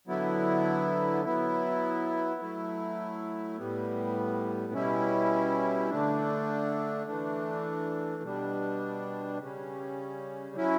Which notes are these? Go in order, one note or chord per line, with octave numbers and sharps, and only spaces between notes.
D3 F#3 B3 E4
F#3 B3 E4
F#3 A3 E4
A2 G3 B3
B2 G3 C#4 E4
D3 A3 D4
E3 A3 D4
B2 G3 D4
C#3 G3 C#4
F#3 C#4 E4